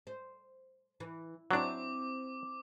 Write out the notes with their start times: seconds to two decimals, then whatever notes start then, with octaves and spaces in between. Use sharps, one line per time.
0.07 C5
1.00 E3
1.51 F#3 C4 D4 E4 C5 D6